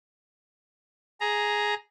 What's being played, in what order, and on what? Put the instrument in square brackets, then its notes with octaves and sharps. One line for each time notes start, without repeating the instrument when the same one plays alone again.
[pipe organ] G#4 A#5